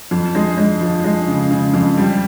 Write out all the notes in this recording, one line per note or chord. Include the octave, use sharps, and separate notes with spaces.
F2
G#3
G#3
F3
G#3
C#3
C#3
F2
G3